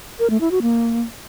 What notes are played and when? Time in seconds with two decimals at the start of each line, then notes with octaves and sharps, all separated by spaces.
0.19 A#4
0.30 A3
0.41 E4
0.51 F#4
0.62 A#3